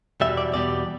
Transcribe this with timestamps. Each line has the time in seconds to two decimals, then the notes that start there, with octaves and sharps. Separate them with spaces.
0.21 E2 B2 G3 E5
0.37 D5
0.54 E2 B2 G3 D5